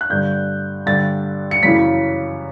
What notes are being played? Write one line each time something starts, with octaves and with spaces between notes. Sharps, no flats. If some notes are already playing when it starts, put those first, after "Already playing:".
F#6
G2 D3 G6
G2 D3 A6
C#7
F#2 C#3 E3 B6